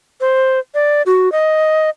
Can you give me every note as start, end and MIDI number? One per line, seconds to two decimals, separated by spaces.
0.21 0.59 72
0.75 1.02 74
1.06 1.32 66
1.32 1.90 75